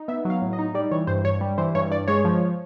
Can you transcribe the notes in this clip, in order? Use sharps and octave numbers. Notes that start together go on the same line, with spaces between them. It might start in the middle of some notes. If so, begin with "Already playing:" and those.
Already playing: D#4
B3 E5
F#3
F5
A2
D#5
D#4
G3 D5
E3 C#5
G2 C5
G2 C#5
G3
E3 C5
G2 C#5
G2 D5
G#3 C#5
F3